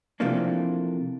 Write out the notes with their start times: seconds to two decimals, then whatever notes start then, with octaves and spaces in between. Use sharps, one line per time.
0.20 C3 E3 F3 A3 A#3 D4